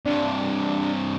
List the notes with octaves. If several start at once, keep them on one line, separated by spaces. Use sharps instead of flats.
G2 C3 D4